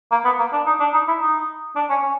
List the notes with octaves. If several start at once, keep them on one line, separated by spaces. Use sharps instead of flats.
A#3
B3
A#3
D4
D#4
D4
D#4
E4
D#4
D4
C#4
C#4